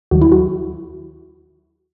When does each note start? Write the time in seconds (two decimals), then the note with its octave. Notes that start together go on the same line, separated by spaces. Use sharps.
0.11 D#2 D#3 F#3 F#4
0.21 E4
0.32 F#4